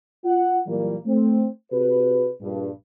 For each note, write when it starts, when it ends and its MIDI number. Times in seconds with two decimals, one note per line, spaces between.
0.24 0.58 65
0.24 0.58 78
0.67 0.97 46
0.67 0.97 52
0.67 0.97 54
0.67 0.97 55
0.67 0.97 58
1.06 1.46 57
1.06 1.46 60
1.71 2.29 48
1.71 2.29 66
1.71 2.29 68
1.71 2.29 71
2.41 2.69 34
2.41 2.69 43